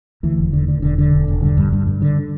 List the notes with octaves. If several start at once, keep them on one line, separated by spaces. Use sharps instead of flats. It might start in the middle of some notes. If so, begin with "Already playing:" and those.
D2 E3
E1
D3
D3
E1 D3
D3
E1
E1
G2 D3
G2
G2
G2
D3